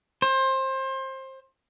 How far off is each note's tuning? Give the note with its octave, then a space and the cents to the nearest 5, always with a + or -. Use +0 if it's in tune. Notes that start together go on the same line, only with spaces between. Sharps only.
C5 +25